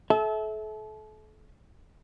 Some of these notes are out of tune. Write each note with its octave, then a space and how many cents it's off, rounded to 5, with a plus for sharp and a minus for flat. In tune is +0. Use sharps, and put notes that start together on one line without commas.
A4 -35 E5 -20